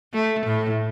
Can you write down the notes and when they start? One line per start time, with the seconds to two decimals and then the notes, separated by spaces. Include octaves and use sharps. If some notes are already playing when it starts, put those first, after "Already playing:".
0.13 A3
0.46 A2